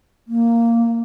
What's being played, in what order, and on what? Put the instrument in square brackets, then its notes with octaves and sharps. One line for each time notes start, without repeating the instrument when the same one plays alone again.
[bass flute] A#3